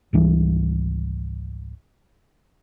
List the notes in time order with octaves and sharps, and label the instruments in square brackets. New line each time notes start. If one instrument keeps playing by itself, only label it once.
[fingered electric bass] G#1 C#2 E3 G3